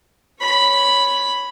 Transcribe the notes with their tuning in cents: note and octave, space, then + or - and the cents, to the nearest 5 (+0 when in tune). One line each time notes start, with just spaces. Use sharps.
C#5 +0 B5 +0